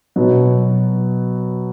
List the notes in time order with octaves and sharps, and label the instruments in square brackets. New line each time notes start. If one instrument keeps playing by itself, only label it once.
[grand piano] B2 F#3 B3